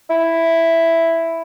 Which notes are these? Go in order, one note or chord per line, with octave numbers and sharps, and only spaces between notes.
E4